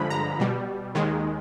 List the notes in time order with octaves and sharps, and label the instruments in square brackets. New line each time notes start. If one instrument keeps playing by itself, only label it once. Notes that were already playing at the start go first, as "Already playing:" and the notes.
Already playing: [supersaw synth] G2 D3 F3 G#3 B5
A#5
B2 G3
D#2 D#3 G#3